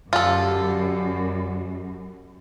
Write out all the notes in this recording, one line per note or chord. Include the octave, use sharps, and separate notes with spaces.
F#2 D3 F4 G4 A4